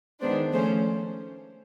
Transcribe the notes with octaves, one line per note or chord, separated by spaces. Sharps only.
D#3 G#3 B3 D4 C5
F3 A3 C#4 C5